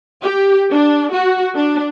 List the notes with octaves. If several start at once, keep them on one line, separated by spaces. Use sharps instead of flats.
G4
D4
F#4
D4